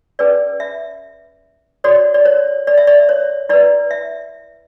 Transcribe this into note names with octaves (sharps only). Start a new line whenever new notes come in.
C#4 G#4 B4 D5
E5
F#4 A4 C#5 D5
D5
C#5
D5
E5
D5
C#5
E4 B4 D5
E5